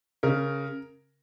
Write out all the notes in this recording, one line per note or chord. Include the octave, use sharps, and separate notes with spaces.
C#3 A#4